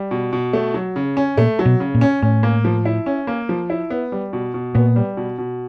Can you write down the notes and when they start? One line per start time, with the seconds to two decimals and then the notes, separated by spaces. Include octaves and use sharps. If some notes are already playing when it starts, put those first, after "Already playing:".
Already playing: G3
0.11 B2
0.33 B2
0.53 A3
0.74 F#3
0.96 C#3
1.17 C#4
1.37 A#2 A3
1.59 F#3
1.65 B2
1.80 C#3
1.95 A#2
2.01 C#4
2.22 A2 C#4
2.43 A#3
2.64 F3
2.85 E4
3.06 C#4
3.27 A#3
3.49 F3
3.70 E4
3.90 B3
4.12 G3
4.33 B2
4.54 B2
4.75 A#2 B3
4.96 G3
5.17 B2
5.38 B2